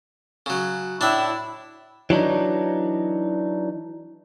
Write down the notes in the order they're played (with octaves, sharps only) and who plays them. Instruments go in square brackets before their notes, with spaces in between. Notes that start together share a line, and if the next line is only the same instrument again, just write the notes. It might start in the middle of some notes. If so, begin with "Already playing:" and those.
[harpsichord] C#3 F#3
[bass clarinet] A2 [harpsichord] D4 E5 [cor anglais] E4
[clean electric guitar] E3 F#3 D4 D#4